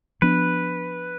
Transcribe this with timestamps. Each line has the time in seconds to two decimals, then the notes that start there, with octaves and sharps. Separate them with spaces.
0.22 F3 B3 D4 B4